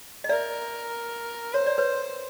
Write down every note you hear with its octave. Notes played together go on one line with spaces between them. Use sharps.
D#5
A#4 D5 E5
C5 C#5
D5
B4 C#5